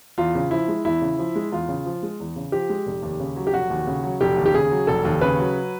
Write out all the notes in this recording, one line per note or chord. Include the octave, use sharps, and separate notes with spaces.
E2 F4
C#3
F3 E4
G#3
E2 E4
C#3
F3
G#3
E2 F4
C#3
F3
G#3
E2
C#3
F3 G4
G#3
F1
D#2
C#3
F#3
G4
F1 F#4
D#2
C#3
F#3
F1 G4
D#2
G4
C#3 G#4
F#3
F1 A4
D#2
C#3 B4
F#3